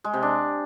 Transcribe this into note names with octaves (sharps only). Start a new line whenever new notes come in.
G#3
C3
D4